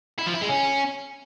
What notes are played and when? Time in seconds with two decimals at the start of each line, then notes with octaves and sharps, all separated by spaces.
0.19 E4
0.26 F3
0.34 E4
0.41 G#3
0.49 C#4